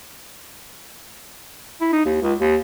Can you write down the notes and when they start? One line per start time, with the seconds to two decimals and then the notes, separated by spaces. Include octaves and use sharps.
1.81 E4
1.93 D#4
2.05 D#2
2.22 C#2
2.40 D#2